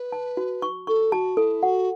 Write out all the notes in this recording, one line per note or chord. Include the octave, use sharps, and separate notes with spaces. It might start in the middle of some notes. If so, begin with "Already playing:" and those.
Already playing: B4
A5
F#4
C#6
A4 C#6
F#4 A5
E4 A4
F#4 F#5